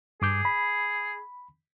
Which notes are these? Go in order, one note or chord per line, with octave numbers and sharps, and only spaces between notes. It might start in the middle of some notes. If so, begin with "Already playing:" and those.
G2 G#4 D6 G6
B5